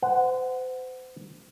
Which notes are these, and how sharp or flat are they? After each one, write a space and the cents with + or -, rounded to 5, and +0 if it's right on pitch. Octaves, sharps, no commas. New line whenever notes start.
C5 -35 F#5 +0